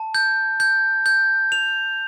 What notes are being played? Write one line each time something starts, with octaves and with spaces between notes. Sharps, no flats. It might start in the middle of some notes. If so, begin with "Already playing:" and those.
Already playing: A5
G6
G6
G6
F7